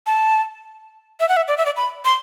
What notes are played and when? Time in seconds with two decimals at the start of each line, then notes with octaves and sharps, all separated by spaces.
0.06 A5
1.20 E5
1.29 F#5
1.37 E5
1.48 D5
1.58 E5
1.66 D5
1.76 B5
2.05 C6